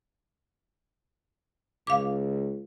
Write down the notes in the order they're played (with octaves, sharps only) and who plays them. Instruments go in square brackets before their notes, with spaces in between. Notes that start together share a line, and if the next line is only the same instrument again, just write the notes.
[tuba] C#2 [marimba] F5 D6